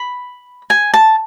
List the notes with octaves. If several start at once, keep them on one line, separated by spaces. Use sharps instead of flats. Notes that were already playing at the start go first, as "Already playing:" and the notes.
Already playing: B5
G#5
A5